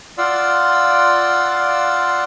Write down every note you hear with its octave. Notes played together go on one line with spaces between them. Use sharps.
F4 D5 F5 F#5 C6 E6